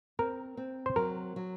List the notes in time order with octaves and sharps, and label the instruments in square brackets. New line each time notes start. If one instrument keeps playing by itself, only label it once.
[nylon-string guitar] C4 [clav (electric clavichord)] A#4
[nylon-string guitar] C4
[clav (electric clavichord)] C5
[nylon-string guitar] F#3 [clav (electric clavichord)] A#4
[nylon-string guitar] F#3